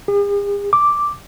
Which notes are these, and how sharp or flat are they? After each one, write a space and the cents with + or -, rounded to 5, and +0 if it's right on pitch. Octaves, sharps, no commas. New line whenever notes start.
G#4 -45
D6 +0